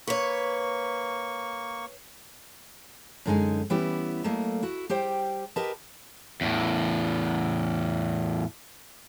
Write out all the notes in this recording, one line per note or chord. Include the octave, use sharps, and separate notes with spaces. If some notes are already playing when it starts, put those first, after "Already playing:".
A#3 B4 C#5 C#6
F#2 D3 G#3 D#4 G#5
E3 G3 B3 C#4 E4 G4
F#3 A3 A#3 D#5
E4 F#4
G3 G4 C5 G5
G4 A#4 B4 D#5 A5
E2 A2